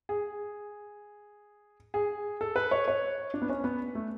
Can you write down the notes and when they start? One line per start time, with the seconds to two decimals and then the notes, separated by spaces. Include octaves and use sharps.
0.09 G#4
1.94 G#4
2.41 A4
2.56 B4
2.71 C#5
2.88 C#5
3.34 D4
3.42 B3
3.50 C#4
3.64 B3
3.95 A3